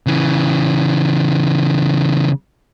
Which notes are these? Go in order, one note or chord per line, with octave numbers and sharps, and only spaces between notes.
C#3 E3